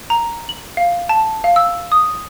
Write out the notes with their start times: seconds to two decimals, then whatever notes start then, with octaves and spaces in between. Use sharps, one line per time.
0.10 A#5
0.49 F#7
0.77 F5
1.09 A5
1.44 F5
1.56 E6
1.92 D#6